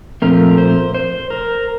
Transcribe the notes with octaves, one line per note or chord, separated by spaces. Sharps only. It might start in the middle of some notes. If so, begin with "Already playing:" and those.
A#2 F3 A3 C4 A#4
C5
C5
A#4